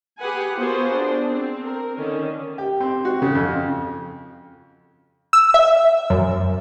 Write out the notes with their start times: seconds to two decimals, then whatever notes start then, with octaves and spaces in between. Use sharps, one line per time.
0.19 G4 G#4 B4 F#5 G#5
0.55 B3 F4 F#4 G#4 A#4 C5
0.93 D4
1.28 C4
1.64 A#4
1.96 D3 D#3 C#4
2.58 G4
2.80 C4
3.05 F#4
3.22 C#3
3.35 F2
5.33 E6
5.54 E5
6.10 F#2